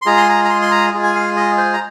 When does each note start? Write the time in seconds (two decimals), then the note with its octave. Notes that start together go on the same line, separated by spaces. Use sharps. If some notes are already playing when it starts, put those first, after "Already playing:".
0.02 C6
0.06 G#3 F4 G#4 A#5
0.17 C6
0.29 A#5
0.45 A#5
0.49 C6
0.62 C6
0.71 A#5
0.93 G#3 F4 G#4
1.03 G#5
1.15 F5
1.36 D#5
1.58 C5
1.73 A#5